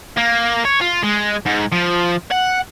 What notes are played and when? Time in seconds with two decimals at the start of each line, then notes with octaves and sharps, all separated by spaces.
0.18 A#3
0.65 C#5
0.81 F4
1.03 G#3
1.46 G#2
1.72 F3
2.31 F#5